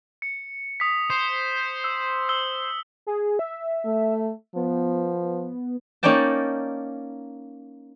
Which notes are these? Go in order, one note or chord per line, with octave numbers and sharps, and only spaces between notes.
C#7
D#6 B6
C5
E6
E6 G7
G#4
E5
A3
F3 B3
A#3 C#4 D#4 D5 G5 A5